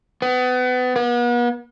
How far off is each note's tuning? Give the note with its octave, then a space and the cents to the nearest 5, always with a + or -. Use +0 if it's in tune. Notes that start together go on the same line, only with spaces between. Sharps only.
B3 +30
B3 -40